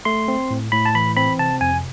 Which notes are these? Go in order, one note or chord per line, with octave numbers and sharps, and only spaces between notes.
A3 C6
C4
A2
A2 B5
A5
E3 B5
C4 B5
C3 A5
F2 G#5